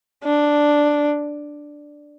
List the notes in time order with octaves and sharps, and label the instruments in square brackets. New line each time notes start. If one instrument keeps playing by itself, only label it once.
[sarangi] D4